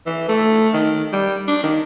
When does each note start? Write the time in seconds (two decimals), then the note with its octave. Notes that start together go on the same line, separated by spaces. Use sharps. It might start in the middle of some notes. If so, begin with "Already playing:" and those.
0.06 E3
0.28 A3
0.73 D#3
1.13 G3
1.48 D4
1.63 D#3